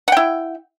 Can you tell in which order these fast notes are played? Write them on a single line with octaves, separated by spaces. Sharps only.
F#5 G5 E4